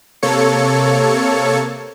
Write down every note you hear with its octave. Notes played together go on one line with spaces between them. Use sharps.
C3 A#3 A4 C#5 C#7